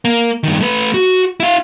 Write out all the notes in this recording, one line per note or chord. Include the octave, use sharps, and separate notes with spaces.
A#3
G2 D#3
A3 B4
F#4
E4 F5